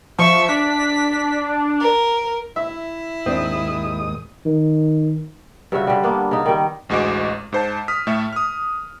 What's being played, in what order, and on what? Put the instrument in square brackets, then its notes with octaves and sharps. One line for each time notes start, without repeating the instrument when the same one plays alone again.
[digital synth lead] F3 [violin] E5 C#6
[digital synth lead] D4 [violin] B6
[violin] A#4
[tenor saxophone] E4 [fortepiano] E5
[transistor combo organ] D#2 G#2 D#6 [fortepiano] C4 D4
[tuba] D#3
[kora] G2 C#3 F#4 E5
D3 G3
A#3 B3 D4
C#3 D#4
D#3 G3
[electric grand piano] A1 D2 G#3 F#4 D#5 D6
G#2 C5 A5
D#6 F6 B6
A2 A3 A4 E5
D#6 F6